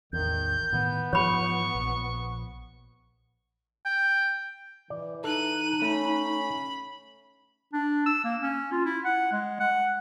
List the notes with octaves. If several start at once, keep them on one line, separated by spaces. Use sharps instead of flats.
A1 E2 D#3 G6
A2 D#3 E3 B3
G#2 E3 F3 C#5 B5 C#6
A#1
G5
E3 D5
D#4 A4 F#6 D#7
A3 C#4 B5
D4
E6
A#3
C#4
F4
E4
F#5
G#3
F#5